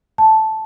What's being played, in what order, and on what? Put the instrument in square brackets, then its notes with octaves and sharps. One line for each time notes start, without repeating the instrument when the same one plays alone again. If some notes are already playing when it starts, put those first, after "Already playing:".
[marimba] A5